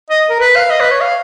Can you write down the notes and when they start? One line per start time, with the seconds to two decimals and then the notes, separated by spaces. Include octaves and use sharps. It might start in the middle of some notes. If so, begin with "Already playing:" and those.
0.10 D#5
0.29 A#4
0.40 B4
0.56 F5
0.70 D#5
0.80 B4
0.91 C#5
1.01 F5